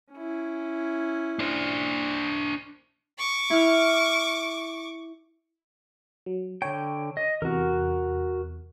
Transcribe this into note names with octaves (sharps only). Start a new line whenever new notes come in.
C#4 E4
D4 C5
C#6 D6
E4 F6
F#3
D3 C#5 G5
D#5
E2 C3 F#4 A#4